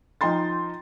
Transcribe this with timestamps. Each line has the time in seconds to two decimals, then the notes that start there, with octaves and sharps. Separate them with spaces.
0.21 F3 D#4 G5 C6 A6